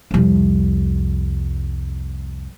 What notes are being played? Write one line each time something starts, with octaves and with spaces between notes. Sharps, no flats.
C2 F2